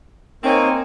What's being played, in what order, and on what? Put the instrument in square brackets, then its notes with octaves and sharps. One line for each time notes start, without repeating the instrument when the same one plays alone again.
[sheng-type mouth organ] A#3 D#4 A#4 C#5 G#5 [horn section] C4